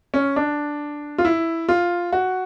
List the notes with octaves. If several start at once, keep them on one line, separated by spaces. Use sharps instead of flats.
C#4
D4
F4
E4
F4
F#4